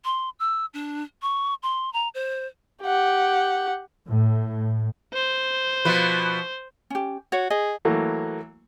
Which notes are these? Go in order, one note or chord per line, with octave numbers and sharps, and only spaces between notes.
C6
E6
D4
C#6
C6
A#5
C5
G4 F#5
A2
C5
B2 F3 B4
C#4 G4
F#4 C#5
G#4 D#5
E3 F#3 A3 A#3